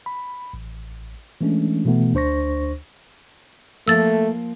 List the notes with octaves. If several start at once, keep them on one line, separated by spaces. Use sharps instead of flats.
B5
A1
E3 G#3 A3 C#4 D4
B2 E3 A3 B3
D2 D4 C5 C#6 A#6
F3 A3 A#3 E6 A6